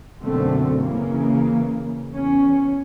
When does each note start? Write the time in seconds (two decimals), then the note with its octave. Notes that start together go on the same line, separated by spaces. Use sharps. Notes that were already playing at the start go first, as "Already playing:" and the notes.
0.22 B1 F#2 B2 D3 A3 C4
0.82 C#3 E3 A#3
2.10 E2 C#4